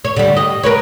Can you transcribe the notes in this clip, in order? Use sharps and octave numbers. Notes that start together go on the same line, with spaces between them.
C#5
D3 G3
D#5
A#4 B4 C#5